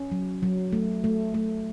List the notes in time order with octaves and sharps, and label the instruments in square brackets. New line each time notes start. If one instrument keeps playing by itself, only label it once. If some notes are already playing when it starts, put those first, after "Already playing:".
Already playing: [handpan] C#4
F#3
F#3
A3
A3
A3